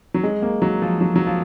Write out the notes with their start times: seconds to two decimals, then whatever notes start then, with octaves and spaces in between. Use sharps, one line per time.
0.14 F#3
0.23 G#3
0.42 A#3
0.62 F#3
0.82 F3
1.01 F#3
1.16 F#3
1.27 F3